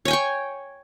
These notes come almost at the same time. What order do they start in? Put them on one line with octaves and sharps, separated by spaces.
C#5 G#5 G5 C#6